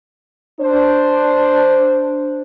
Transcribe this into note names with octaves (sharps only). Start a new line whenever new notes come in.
D4 C5